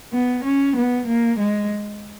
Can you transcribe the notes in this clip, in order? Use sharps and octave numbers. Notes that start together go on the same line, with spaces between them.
B3
C#4
B3
A#3
G#3